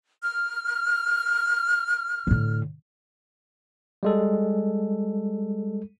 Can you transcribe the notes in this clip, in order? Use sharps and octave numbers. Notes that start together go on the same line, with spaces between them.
F6
A2 D3
G3 G#3 A4